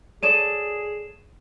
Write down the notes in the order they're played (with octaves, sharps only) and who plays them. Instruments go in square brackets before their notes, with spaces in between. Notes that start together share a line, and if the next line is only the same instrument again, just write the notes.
[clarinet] G#4 [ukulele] A4 C#5 D5 [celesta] D#7 E7